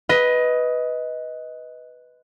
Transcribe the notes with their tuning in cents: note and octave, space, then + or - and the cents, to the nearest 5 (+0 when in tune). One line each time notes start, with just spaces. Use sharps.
B4 +0 D#5 +15